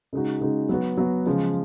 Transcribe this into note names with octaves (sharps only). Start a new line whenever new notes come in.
C#3 G#3 D#4 F#4
C#3 G#3 D#4 F#4
F#3 B3 F#4
F#3 B3 F#4
C#3 F3 G#3